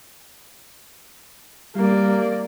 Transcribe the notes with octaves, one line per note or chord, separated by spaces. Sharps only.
G3 A#3 D5